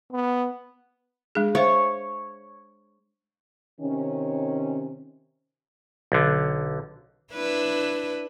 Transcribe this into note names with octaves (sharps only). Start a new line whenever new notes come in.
B3
G#3 D4 G#4
C5 C#5 E5 F5
C3 D#3 C#4
B1 D3
D4 E4 B4